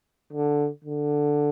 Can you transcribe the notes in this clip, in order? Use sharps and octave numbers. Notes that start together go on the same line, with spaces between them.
D3
D3